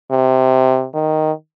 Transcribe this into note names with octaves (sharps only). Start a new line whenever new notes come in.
C3
D#3